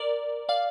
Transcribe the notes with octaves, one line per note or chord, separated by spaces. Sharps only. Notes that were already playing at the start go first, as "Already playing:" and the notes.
Already playing: A#4 D5
D5 F5